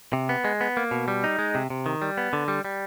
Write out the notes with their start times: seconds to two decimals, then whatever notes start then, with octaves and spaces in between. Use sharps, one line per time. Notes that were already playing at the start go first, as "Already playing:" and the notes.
0.13 C3
0.29 B3
0.45 G#3
0.61 B3
0.77 A#3
0.91 B2
1.08 G3
1.24 D#4
1.39 G#3
1.55 C3
1.70 C3
1.86 D#3
2.02 G3
2.18 B3
2.33 D3
2.48 G3
2.65 G3